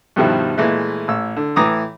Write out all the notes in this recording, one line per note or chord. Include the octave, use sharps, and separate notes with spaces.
G2 B2 D#3 F3 G3 E4
A#2 E3 G#3 A3
A1 E6
D3
A2 E3 A#5 D6 D#6